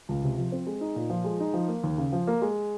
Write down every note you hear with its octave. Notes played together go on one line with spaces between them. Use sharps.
C#2
C3
F3
C4
G#3
D#4
A#2
F3
G#3
D#4
F3
A#3
D#2
C#3
F3
A#3
G#3